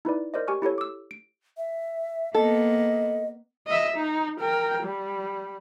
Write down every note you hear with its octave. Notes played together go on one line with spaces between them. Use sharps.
D#4 E4 B4 D5
A#4 C5 D5 D#5
G4 G#5 C#6 F6
E4 G4 A4 C#5
D6 E6
D7
E5
A#3 B3 A4 D#5
D#5 E5
D#4
A#4 G5
G3